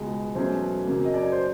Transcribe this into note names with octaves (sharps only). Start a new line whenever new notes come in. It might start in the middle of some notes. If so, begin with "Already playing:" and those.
Already playing: C#2 B2 G#3
E2 B2 F#3 A3 C#4 C5
F#2 C#3 F#3 A#3
D#5
D5
C#5
C5